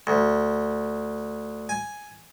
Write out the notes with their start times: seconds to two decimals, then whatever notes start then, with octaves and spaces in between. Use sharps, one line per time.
0.07 D2
1.69 G#5